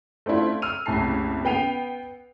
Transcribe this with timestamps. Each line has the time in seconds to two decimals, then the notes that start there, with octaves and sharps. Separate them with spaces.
0.26 A3 C4 D4 E4 F4
0.62 E6 F6 D#7 F7
0.86 F#1 C2 A2 A5 C7
1.45 B3 G5 C7 D#7 F7